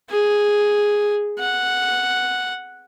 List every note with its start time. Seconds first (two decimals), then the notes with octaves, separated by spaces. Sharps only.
0.10 G#4
1.39 F#5